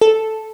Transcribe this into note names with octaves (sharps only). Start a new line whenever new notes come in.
A4